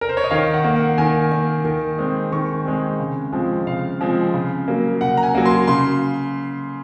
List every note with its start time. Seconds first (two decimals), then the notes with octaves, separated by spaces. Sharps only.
0.01 A#4
0.09 C5
0.17 C#5
0.24 D#5
0.31 D#3 F5
0.54 F#5
0.64 A#3
0.76 F#5
0.98 D#3 G#5
1.32 A#3
1.65 D#3
1.98 G#3 C4
2.32 D#3 C#6
2.66 G#3 C4
2.99 C#3
3.32 F3 G#3 C4
3.67 C#3 F5
4.01 F3 G#3 C4
4.34 C#3
4.68 F#3 A#3
5.01 C#3 F#5
5.17 A#5
5.23 G#5
5.35 F#3 A#3
5.46 C6
5.68 C#3 C6